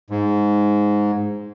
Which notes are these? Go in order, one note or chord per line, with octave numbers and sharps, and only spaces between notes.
G#2